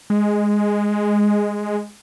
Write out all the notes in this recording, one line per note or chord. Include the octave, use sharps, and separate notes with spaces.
G#3